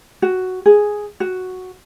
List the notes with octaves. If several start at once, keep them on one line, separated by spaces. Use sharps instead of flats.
F#4
G#4
F#4